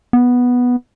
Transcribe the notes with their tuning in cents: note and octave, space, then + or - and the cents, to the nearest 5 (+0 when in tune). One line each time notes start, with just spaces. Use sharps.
B3 -5